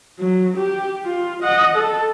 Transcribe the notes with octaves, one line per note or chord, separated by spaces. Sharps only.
F#3
G4
F4
D#5 F#5
A4